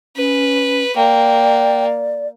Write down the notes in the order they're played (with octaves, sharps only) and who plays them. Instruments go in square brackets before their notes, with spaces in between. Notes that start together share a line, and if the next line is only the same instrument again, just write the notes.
[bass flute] C#4 [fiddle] B4
[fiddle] A#3 [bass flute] D5 [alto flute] G5